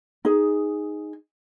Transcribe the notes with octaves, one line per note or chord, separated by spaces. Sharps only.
D#4 G#4